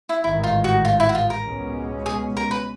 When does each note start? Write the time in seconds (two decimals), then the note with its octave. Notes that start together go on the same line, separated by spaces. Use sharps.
0.09 E4
0.24 A1 G#2 D#3 E4
0.44 F4
0.64 F#4
0.85 F4
1.00 E4
1.09 F#4
1.15 F4
1.30 A#4
1.45 C#2 B2 G#3 C#4
2.06 G#4
2.37 A#4
2.51 B4